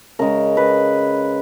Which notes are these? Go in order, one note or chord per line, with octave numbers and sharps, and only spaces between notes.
C#3 G#3 A#4
B4